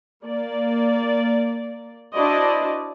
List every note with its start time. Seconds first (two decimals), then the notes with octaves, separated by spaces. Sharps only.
0.24 A#3 D5
2.14 D4 E4 F#4 C5 D5 D#5